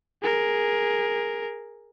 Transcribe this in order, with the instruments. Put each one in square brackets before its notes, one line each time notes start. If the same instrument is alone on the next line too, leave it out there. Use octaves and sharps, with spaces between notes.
[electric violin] G#4 A#4